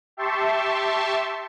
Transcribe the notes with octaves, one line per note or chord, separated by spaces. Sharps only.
G4 E5 A5 C6 C#6